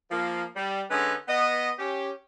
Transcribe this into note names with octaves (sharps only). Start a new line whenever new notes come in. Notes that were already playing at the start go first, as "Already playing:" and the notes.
F3 A#3
G3
D3 G#3 B3 C#4 D#4
B3 D#5
C#4 G4